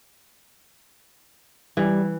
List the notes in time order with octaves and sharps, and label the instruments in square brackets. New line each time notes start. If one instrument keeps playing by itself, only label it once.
[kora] E3 [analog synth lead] G3